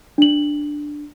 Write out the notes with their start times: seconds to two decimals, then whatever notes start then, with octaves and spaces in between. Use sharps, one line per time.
0.18 D4 F#7